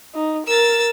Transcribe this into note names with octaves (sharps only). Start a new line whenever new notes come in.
D#4
A#4 E6 A6